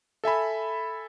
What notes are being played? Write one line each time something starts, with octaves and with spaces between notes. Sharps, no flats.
A4 E5 G#5 B5